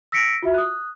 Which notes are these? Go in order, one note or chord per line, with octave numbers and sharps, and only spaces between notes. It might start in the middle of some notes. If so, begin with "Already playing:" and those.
E6 A#6 B6 C#7 D7
F4 F#4 E5
D#6 F#6